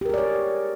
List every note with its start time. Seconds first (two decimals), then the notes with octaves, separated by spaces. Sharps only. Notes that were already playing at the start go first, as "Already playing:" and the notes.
0.01 G4
0.05 A#4
0.10 G#4
0.14 D5
0.18 C#5